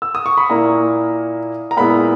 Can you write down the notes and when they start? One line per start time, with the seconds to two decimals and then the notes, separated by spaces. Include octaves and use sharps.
0.02 E6
0.15 D#6
0.26 C#6
0.37 B5
0.49 A#2 A#3 E4 A#5
1.71 A#5
1.77 A#2 G#3 B3 E4 B5